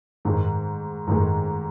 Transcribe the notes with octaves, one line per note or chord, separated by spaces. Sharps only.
G#2 D#3 G#3
G#2 D#3 G#3